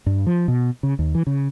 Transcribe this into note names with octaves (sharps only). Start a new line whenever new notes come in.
G2
F3
B2
C#3
D#2
E3
C#3